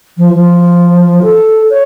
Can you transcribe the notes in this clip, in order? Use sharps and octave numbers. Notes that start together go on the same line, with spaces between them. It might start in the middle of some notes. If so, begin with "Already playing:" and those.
F3
F3
A4
C#5